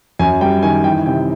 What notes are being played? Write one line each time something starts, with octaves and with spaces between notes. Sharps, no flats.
F#2 G#5
G3 G5
D#3 G#5
E3 G5
C3 G5